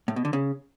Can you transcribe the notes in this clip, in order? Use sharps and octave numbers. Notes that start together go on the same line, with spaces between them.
A2
B2
D3
C#3